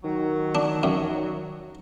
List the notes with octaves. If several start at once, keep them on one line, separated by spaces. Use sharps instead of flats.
D#3 F#3
D4
F#2